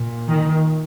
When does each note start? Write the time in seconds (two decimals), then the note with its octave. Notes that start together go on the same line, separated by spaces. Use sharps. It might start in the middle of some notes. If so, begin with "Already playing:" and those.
Already playing: A#2
0.28 D#3